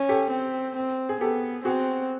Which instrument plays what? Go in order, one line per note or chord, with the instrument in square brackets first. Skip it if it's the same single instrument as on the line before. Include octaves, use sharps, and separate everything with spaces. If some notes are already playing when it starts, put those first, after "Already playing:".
Already playing: [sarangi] C#4
[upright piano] G4 A4
[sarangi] C4
C4
[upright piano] G#4
[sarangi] B3 [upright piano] G4 A4
[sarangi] C4 [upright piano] F#4 G#4